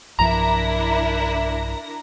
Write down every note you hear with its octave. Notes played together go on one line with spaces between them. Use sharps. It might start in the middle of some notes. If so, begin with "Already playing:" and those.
B1 G2 F3 D4 E4 A#4 A#5